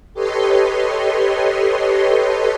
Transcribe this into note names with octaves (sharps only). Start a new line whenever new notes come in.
G4 A4 B4 C#5 D#5 C6